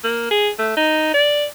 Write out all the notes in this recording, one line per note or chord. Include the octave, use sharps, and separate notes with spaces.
A#3
G#4
A3
D#4
D5